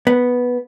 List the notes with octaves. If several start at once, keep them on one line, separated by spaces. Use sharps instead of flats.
B3